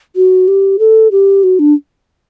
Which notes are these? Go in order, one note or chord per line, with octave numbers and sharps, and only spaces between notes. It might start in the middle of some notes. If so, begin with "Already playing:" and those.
F#4
G4
A4
G4
F#4
D4